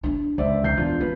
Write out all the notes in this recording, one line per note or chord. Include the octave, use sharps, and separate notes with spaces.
D4 E4
C#2 C5 D5 E5
F1 G6 C7
E2 E3 D4 F4
C#4 B4